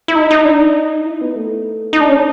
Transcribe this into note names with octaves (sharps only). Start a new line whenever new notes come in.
E4
D#4
D#4
D4
D#4
E4
B3
A3
D#4
D4
C#4